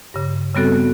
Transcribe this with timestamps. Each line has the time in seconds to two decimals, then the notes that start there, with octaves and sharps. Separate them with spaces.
0.14 G2 C#3
0.55 C#3 G3 B3 C4 F#4 A4